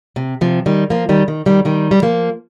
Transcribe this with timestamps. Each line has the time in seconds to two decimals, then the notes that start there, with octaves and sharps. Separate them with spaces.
0.16 C3
0.41 C3 F3
0.66 D#3 G3
0.90 F3 A#3
1.09 D#3 G3
1.28 D#3
1.46 D#3 G3
1.65 D#3 G3
1.91 G3
2.02 F3 A#3